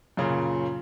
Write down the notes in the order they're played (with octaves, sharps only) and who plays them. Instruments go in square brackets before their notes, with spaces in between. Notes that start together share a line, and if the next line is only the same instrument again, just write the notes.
[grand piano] F#2 A#2 C#3